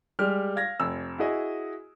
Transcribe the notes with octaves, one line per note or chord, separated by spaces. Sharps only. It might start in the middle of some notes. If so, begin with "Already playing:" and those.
G3 G#3 G4 F6
F5 G#6 A#6
F1 E6
E4 F#4 G#4 D#5